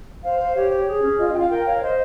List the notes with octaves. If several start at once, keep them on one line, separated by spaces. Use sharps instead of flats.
C5 F5
C5
G4 C#5
C#5
G#4
C#4
F4 D#5
D#5
F4 G5
F5
A#4 G5
C#5 F5
C#5
C5 D#5